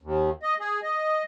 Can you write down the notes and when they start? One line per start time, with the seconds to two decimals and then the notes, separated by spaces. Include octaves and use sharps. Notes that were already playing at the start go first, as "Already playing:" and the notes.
0.02 D#2
0.43 D#5
0.60 G#4
0.83 D#5